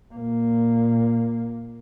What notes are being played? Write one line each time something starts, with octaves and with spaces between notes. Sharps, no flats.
A#2 A#3